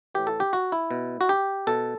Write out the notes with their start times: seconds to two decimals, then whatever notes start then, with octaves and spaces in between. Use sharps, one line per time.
0.14 A2 E3 G4
0.27 A4
0.40 G4
0.53 F#4
0.72 E4
0.91 B2
1.21 F#4
1.29 G4
1.67 B2 A4